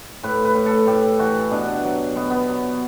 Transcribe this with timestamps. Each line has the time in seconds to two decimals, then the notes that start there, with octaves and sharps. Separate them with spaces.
0.23 A2 B4
0.44 B4
0.55 A2
0.66 A4
0.87 A2 G4
1.19 E3 F#4
1.51 B2 D4
1.84 F#3
2.16 B2 B3
2.30 B3
2.48 F#3